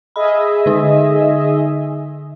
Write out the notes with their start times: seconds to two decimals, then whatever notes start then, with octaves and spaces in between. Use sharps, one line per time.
0.16 G#4 D#5 E5 B5
0.66 D3 D#4